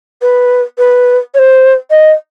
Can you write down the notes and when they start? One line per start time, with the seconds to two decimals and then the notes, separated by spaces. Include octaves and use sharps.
0.21 B4
0.78 B4
1.34 C#5
1.38 C5
1.90 D#5